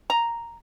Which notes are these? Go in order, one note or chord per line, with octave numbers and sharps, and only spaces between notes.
A#5